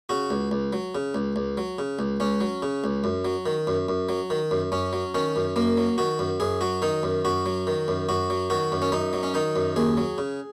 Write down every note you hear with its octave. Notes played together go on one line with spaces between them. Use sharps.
C#3 F#4
C#2
C#2
F#3
C#3
C#2
C#2
F#3
C#3
C#2
C#2 C#4
F#3
C#3
C#2
F#2
F#3
D#3
F#2
F#2
F#3
D#3
F#2
F#2 C#4
F#3
D#3 C#4
F#2
F#2 A#3
F#3
D#3 F#4
F#2
F#2 G#4
F#3 F#4
D#3 D#4
F#2
F#2 F#4
F#3
D#3
F#2
F#2 F#4
F#3
D#3 F#4
F#2
C#4
F#2 D#4
F#3
C#4
D#3 D#4
F#2
D#2 G#4
F#3
C#3